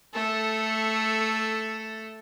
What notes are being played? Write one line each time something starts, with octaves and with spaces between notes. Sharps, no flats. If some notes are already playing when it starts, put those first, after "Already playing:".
A3 A4